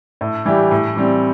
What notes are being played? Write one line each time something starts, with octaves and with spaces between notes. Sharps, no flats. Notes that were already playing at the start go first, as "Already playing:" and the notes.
A2
E3 G3 E4 G4
A2
E3 G3 C4